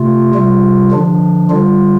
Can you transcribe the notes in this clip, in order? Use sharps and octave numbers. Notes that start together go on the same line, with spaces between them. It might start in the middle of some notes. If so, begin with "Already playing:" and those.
Already playing: C3 A3 F4
C3 G3 F4
D3 F3 D4
D3 G3 F4